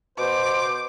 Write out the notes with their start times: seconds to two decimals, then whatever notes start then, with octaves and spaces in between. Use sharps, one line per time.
0.18 B2 C5 D6